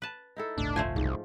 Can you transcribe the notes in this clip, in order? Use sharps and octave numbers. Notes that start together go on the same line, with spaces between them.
B4 A5
D#4 E4 A4
G1 C#2 A2 D4
F3 A3 C5 G#5
C2 G#2